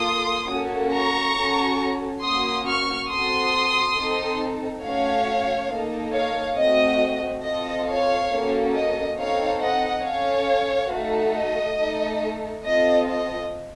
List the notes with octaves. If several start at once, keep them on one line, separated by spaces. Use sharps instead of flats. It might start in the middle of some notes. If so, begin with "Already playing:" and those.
Already playing: A#3 F4 A4 C6 D#6
A#3 C#4 F#4 A4
A#5 C#6
C#4 F#4 A4
A#3 C#4 F#4 C6 D#6
C#6 F6
C4 F#4 A4 C6 D#6
C4 D#4 A4
A3 C#4 F#4 C#5 F5
A#3 D#4 A4
C#5 F5
A3 C4 F#4 D#5
C4 F4 A4 D#5
C#5 F5
A#3 C#4 F#4 A4
D#5
C4 D#4 A4 C#5 F5
D#5 F#5
C#4 A4 C#5 F5
A3 D#4 F#4 A4
D#5
A3 D#4 A4
C4 F4 A4 D#5
D#5